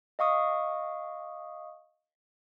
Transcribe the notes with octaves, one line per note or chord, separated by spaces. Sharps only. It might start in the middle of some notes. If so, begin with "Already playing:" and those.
D#5 F5 C#6 D#6